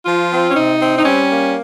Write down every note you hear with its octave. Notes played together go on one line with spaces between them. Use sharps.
F3 F4
C4
C#4
C3 D#4
C4
D#4
G3 C#4
A#3